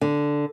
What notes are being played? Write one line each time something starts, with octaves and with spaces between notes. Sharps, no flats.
D3